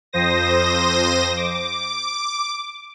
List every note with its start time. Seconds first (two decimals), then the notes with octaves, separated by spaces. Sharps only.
0.13 F2 C5 D#6 A#6
1.37 D6